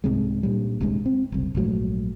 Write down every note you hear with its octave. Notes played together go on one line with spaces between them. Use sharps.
C2 G#2 C3 G#3
G2 A#2 G3
D#1 C2 G2 G#3
C4
F#1 C2
A#1 G#2 F#3 A3